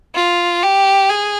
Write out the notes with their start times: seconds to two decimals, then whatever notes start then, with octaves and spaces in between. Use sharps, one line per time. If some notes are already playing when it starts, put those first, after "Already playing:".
0.15 F4
0.63 G4
1.10 G#4